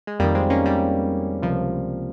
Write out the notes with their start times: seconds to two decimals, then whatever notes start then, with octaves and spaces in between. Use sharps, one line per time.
0.07 G#3
0.19 F2 D#3 G3 A#3
0.35 G#3 C4
0.50 A#3 C#4
0.65 G3 A#3
1.42 C#2 C3 F3